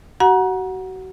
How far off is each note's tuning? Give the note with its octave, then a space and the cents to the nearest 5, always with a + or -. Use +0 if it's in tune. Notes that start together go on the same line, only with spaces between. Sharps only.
F#4 +30 F#5 -10 A#5 +35